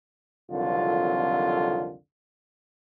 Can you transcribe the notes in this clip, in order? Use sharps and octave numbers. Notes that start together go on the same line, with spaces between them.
C2 F2 D3 D#3 F#3 F4